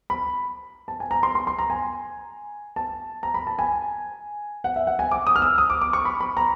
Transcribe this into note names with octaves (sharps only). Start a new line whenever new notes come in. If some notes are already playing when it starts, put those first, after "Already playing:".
B5
A5
G#5
A#5
C6
C6
C6
A#5
G#5
A5
A#5
B5
A5
G#5
F#5
E5
F#5
G#5
D6
D#6
F6
E6
D#6
D6
D6
C#6
B5
B5
A#5